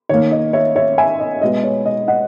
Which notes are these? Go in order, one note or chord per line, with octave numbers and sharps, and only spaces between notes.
D#3 A#3 C#5
D#5
C#5 E5
C#5 E5
E5 G#5
D#5
B2 G#3 B3 D#5
C#5
D#5
D#5 F#5